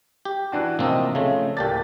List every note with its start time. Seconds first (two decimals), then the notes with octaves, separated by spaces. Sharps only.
0.25 G4
0.52 E3 D4 F#4
0.79 C3 F3 A#3 C4 D#5
1.15 C#3 A3
1.57 D1 A#3 G4 A4 D5 A6